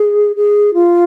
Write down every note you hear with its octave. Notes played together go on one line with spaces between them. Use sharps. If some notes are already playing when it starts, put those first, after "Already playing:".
Already playing: G#4
G#4
F4